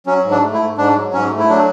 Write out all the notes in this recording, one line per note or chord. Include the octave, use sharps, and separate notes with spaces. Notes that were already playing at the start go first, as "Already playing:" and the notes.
F#3 C#4
G#2
D4
A3
E4
G#2
G#2 D4
F#3
G#2 C#4
A3
E4
F#3 D4